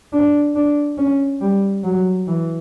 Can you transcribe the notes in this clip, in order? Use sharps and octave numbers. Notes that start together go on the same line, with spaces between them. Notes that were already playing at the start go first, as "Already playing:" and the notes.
D4
D4
C#4
G3
F#3
E3